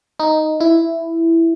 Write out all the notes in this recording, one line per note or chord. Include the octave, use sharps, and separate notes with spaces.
D#4
E4